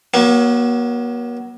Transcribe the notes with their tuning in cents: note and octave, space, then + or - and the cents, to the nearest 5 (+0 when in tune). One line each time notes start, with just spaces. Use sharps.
F#3 +20 A#3 +45